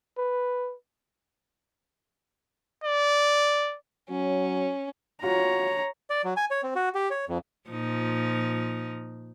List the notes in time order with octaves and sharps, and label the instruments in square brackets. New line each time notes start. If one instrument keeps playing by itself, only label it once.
[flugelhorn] B4
[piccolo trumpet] D5
[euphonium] F#3 [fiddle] C#4
[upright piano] F4 F#4 [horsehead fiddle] C#5 A#5
[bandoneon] D5
F#3
G#5
C#5
C4
F#4
G4
C#5
F2
[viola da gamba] A#2 F3 D#4